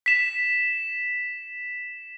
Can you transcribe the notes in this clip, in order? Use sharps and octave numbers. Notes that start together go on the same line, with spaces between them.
B6 E7